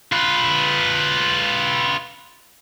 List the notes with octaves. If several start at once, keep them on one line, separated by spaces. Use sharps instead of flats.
F4 B4